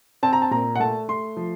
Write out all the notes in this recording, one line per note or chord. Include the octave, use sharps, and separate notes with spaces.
C4 A5
A#5
A5
A#2 A#5
F#5
A3 A5
A3 C6
F3